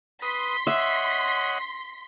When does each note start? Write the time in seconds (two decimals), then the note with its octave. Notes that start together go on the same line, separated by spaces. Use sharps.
0.22 B4 C6 D#6 B6
0.67 C#5 D#5 E5 F#5